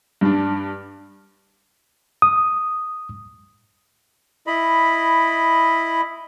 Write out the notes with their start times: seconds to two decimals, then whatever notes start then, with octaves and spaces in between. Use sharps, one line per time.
0.21 G2 D4
2.22 D#6
4.47 E4 D#5 B5